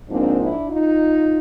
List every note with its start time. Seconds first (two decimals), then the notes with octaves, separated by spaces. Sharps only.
0.09 G#2 F3 A#3 C4 D4
0.39 D4 E4
0.69 D#4 F4